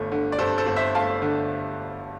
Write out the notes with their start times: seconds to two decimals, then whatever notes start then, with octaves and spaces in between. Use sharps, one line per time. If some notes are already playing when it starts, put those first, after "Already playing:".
Already playing: G1 G2 A3
0.12 D3
0.32 D5
0.39 G2 A4 C5
0.58 A4 C5
0.66 G1
0.76 C5 E5
0.95 A3 F5 A5
1.22 D3